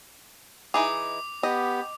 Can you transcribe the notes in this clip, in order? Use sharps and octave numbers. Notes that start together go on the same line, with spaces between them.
E3 D#4 G#4 D6
B3 G4 D#5